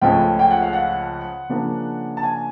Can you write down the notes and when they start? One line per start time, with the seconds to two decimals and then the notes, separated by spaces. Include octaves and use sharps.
0.01 C#2 C#3 F3 A3 C#4 G5
0.39 G5
0.51 F#5
0.62 F5
0.73 F#5
1.49 C#3 F3 A#3 D4
2.17 A5
2.23 G#5